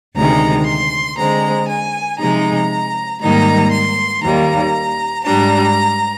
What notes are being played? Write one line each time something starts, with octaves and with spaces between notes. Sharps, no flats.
D2 C3 D#3 G#3 D#4 A#5
C6
D3 G#3 C4 A#5
G#5
C3 F3 G#3 D#4 A#5
G#2 D#3 G3 A#3 D#4 A#5
C6
D#2 D#3 G3 A#3 A#5
G#2 G3 D4 A#5